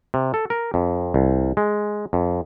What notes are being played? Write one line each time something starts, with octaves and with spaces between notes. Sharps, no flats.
C3
A4
A#4
F2
C2
G#3
F2